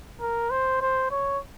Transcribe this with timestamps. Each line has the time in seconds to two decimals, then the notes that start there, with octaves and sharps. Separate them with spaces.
0.21 A#4
0.51 C5
0.81 C5
1.11 C#5